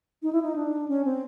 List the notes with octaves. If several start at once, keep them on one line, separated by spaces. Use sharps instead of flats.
D#4
E4
D#4
D4
C#4
C4